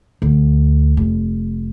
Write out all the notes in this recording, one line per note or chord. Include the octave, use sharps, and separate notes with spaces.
D2
F1